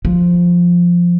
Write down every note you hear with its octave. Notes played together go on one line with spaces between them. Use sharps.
F3